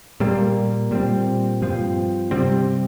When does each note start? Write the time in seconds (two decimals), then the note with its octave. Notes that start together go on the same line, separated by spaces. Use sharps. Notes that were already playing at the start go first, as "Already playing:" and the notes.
0.20 A#2 G3 A#3
0.91 A#2 G3 C4
1.62 G2 F3 C4
2.31 C3 G3 C4